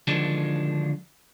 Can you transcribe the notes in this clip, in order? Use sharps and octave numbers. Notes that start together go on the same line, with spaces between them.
D3 D#3 F3 F#3 G#3 D4